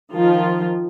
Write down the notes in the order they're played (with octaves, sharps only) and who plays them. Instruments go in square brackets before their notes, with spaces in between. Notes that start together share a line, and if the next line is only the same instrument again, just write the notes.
[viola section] D#3 F3 F4